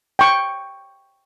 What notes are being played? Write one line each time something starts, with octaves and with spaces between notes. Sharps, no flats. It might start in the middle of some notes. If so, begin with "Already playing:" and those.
G5 C#6